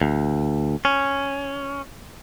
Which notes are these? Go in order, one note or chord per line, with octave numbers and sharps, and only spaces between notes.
D2
C#4